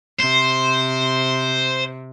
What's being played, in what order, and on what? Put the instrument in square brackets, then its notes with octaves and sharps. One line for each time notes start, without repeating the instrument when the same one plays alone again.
[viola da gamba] C3 [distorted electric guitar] C5